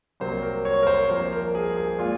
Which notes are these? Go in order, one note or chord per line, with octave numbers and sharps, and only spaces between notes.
C2 C3 F#3 A#3 C5
A#4
C#5
A#4
C5
C2 C3 F3 A#3 C5
A#4
G#4
G#4
A#2 G#3 F4